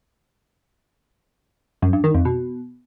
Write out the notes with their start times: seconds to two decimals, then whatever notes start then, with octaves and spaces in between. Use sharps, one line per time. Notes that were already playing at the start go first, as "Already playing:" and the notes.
1.82 F#2
1.93 G2
2.04 D#3
2.15 F2
2.25 B2